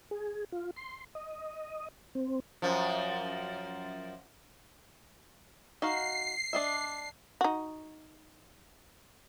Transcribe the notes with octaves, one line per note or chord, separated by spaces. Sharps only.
G#4
F4
C6
D#5
C4
F#2 F3
D#4 F#4 F5 C7
D4 D#5 E5
D#4 F#4